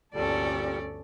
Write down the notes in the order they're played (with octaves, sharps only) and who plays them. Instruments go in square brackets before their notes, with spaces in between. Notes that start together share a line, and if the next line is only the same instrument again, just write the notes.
[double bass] G1 D2 [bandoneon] A#2 G3 [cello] C#4 D5 [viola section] A4